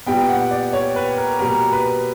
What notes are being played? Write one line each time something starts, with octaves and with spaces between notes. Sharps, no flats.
A#2 G3 B3 G5
F#5
D5
C#5
B4
A#4
B2 G3 A#3 A#4
B4